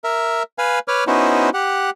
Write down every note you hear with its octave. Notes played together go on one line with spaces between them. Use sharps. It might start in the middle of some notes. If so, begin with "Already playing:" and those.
A#4 E5
B4 F5 G#5
B4 C#5 D6 F6
B3 C#4 D#4 E4 F#4 C5
G4 F#5